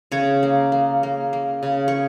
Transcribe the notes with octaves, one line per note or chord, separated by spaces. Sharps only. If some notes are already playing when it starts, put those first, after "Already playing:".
C#3 C#5
A#3
A#3
A#3
A#3
C#3
C#5